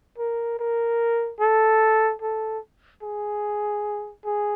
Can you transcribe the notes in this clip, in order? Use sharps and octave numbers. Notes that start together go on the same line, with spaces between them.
A#4
A#4
A4
A4
G#4
G#4